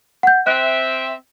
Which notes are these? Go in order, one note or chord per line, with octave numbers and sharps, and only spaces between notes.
F#5 G6
C4 E5 F#6